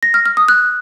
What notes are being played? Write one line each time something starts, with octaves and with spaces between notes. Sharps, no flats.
A#6
F6
F6
D#6
F#6